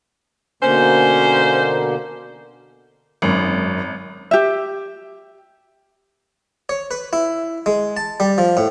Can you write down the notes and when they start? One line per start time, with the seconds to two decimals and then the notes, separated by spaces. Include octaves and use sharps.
0.63 B2 D3 A#3 C#4 C5
3.22 G#1 F#2
4.31 G4 E5
6.69 C#5
6.91 B4
7.13 E4
7.66 G#3
7.97 A5
8.20 G3
8.38 F3
8.57 A2